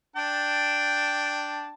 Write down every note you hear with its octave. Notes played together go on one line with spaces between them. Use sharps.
D4 G5 A5